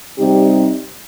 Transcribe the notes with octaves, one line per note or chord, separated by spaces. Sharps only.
C3 G3 C4 D#4 G4